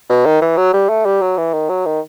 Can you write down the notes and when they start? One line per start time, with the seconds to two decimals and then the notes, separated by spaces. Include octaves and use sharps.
0.10 B2
0.26 D#3
0.42 E3
0.57 F#3
0.73 G3
0.89 A3
1.06 G3
1.22 F#3
1.38 E3
1.53 D#3
1.69 F#3
1.86 D#3